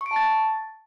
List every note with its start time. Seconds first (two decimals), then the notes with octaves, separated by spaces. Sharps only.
0.01 C#6
0.06 D7
0.11 A5
0.16 A6